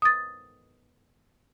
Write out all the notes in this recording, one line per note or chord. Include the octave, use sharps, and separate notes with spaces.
D#6 A6